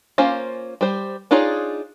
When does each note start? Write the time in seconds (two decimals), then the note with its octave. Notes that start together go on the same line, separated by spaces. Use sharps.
0.18 A#3 C#4 F4 C5 F5
0.81 G3 C5
1.31 D4 D#4 F4 G#4 C#5